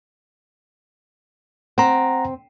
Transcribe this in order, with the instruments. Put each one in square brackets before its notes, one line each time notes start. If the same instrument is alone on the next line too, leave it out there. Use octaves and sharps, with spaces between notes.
[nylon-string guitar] C4 [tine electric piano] F#5 A#5